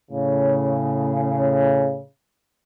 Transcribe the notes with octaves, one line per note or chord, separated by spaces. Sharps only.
A2 C#3